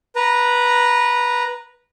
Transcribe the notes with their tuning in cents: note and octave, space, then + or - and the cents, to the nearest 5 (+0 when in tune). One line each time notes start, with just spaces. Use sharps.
B4 -15 A#5 +0